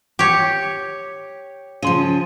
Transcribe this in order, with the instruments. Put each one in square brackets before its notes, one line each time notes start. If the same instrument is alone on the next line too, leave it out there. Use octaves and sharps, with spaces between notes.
[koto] G4 C#5
[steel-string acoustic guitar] C#3 F3 [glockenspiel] C6 D#7